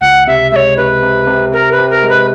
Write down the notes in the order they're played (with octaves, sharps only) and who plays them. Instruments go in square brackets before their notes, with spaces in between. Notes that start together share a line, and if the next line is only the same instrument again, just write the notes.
[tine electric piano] C#2 [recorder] F#5
[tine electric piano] C3 [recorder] E5
[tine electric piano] G#3 [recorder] C#5 E5
[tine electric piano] C3 [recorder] B4
[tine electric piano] C3
C3
[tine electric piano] C3 [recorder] A#4
[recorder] B4
[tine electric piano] C3
[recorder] A#4
[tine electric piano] G#3
[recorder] B4